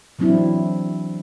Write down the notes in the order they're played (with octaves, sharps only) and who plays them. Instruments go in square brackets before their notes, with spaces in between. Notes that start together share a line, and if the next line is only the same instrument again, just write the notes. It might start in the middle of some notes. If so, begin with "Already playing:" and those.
[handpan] E3 F#3 C4 D4 E4